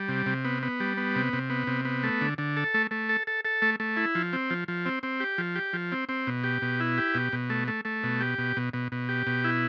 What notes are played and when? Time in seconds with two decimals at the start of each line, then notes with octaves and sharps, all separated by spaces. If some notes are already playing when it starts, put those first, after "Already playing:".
Already playing: G3
0.09 C3
0.26 C3
0.45 B3
0.63 B3
0.80 G3
0.97 B3
1.16 C3
1.33 C3
1.50 B3
1.67 C3
1.85 B3
2.03 A3
2.21 D3
2.38 D3
2.57 A4
2.74 A3
2.91 A3
3.09 A4
3.27 A4
3.45 A4
3.62 A3
3.80 A3
3.97 E4
4.15 F3
4.33 C4
4.50 F3
4.68 F3
4.86 C4
5.03 C4
5.20 G4
5.38 F3
5.55 G4
5.73 F3
5.92 C4
6.09 C4
6.27 B2
6.44 G4
6.62 B2
6.80 E4
6.98 G4
7.15 B2
7.33 B2
7.50 A3
7.68 A3
7.85 A3
8.04 B2
8.21 G4
8.38 B2
8.57 B2
8.73 B2
8.92 B2
9.09 G4
9.27 B2
9.44 E4